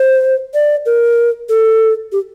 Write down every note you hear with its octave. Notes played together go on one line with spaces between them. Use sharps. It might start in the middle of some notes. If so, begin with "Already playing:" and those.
Already playing: C5
D5
A#4
A4
G4